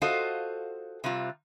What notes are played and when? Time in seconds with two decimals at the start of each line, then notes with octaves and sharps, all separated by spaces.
0.02 F4 F#4 A4 C5 D#5 F5
1.04 C3 G3 C4 F4